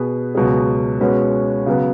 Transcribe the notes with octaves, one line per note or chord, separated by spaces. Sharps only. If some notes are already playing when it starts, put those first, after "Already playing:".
Already playing: B2 B3 G#4 B4
C#2 B2 F#3 B3 G#4
B2 G#3 C#4 F#4 B4
C#3 F#3 B3